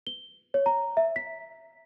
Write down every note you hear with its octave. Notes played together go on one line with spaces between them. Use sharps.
G7
C#5
A#5
E5
B6